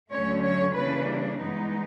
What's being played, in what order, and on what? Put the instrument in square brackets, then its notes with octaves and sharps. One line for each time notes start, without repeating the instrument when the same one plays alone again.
[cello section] D2 D3 F#3 A3 C#4 C#5
C#5
C#3 E3 G3 A#3 D4 B4
G2 E3 G#3 B3 D#4